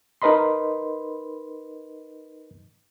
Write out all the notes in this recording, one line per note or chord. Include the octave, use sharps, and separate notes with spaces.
D#4 A#4 B4 D#5 B5 C6